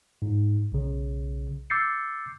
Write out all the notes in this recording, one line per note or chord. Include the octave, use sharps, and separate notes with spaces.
G#2
B1 C#3
D6 E6 G6 A6 C7 C#7